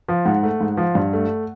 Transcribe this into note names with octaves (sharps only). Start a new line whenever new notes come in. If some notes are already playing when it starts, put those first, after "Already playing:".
F3
G#2 F#5
A3
G#2
F3
G2
A3